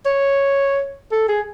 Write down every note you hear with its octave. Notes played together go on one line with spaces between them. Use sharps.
C#5
A4
G#4